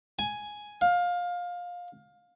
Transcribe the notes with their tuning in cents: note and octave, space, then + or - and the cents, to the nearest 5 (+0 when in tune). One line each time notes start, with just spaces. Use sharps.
G#5 +5
F5 +20